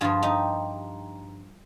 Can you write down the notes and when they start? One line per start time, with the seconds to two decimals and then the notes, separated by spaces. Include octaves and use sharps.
0.01 G2 F3 F4 G#4
0.23 D#4 G4